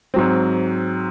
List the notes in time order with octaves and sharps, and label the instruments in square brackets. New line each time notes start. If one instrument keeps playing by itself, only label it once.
[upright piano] G#2 F#3 C4